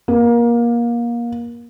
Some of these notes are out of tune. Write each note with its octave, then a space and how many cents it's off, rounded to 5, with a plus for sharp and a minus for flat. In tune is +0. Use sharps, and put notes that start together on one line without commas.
A#3 +25